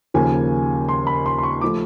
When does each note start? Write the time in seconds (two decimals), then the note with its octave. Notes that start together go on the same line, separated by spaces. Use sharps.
0.14 D#2 C#3 F3 A#3 G#5
0.89 C6
1.07 B5
1.26 C6
1.38 C6
1.43 C#6
1.61 F3 A3 D6